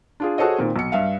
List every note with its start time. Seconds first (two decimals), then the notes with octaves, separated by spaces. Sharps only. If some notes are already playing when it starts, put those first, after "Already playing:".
0.20 D4 F4 G#4
0.38 F#4 G#4 A4 C5 C#5 D#5
0.58 A#2 D#3 A#3 C4
0.76 B1 C#7
0.92 G2 E5 F5